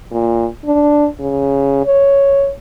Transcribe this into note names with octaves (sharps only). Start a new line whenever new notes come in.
A#2
D4
C#3
C#5